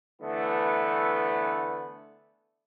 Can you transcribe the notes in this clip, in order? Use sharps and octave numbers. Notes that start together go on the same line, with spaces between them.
D3 E3 A3 B3